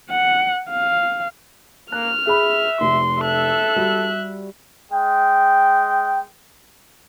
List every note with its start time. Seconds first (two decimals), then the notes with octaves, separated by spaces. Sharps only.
0.10 F#5
0.70 F5
1.92 A#3 F6 F#6
2.27 G#4 E5 B5
2.81 F1 C6
3.21 A4 E5 F#6
3.76 G3 F#4
4.91 G#3 G5